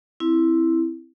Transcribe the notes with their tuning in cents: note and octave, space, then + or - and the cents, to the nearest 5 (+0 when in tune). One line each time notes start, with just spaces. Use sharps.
C4 +0 E4 +0